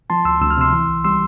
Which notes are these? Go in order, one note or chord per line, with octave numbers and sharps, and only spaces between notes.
F3 A5 C6
D2 C6 E6
D2 E6
F6
C3 C6 E6
E3
C2
G3 C6 E6